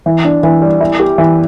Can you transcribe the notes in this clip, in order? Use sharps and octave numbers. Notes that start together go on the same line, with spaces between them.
E3
D4
E3
G3
E4
G4
E3